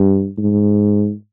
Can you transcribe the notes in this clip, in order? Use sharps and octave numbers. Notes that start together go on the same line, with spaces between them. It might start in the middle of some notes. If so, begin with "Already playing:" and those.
Already playing: G2
G#2